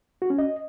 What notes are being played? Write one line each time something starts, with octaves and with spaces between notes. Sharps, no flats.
F#4
C#4
D#5